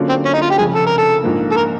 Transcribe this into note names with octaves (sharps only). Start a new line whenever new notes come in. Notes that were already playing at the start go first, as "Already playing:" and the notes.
Already playing: D3 F#3 A#3 C#4 F4
C4
C#4
D#4
F4
G4
F1 F2 C#3 G#4
A4
A#4
A4
A#1 G#2 F3 A#3
A4
A#4